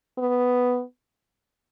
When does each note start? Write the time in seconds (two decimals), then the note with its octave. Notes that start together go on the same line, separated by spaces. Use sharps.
0.18 B3